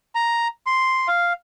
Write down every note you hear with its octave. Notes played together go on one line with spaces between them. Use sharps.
A#5
C6
F5